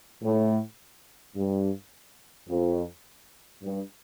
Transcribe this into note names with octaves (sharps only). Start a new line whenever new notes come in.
A2
G2
F2
G2